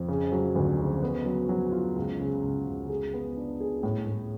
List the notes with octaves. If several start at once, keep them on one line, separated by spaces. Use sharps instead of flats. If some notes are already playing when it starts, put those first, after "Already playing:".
Already playing: F2
C#3
F#3
D2
C#3
B3
F#3
F#3
F4
C#2
C#3
C#2
C#2
G#4
B3
D4
G#4
A2
A2